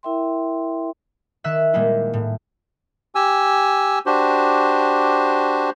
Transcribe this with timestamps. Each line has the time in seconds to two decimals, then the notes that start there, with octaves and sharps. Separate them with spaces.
0.03 E4 A#4 E5 G5 C6
1.44 D#3 E5 E6 F#6
1.73 A#2 G3 G#3 A#3 E4
2.13 A2
3.15 G4 G#5 E6
4.06 D4 F#4 G4 C5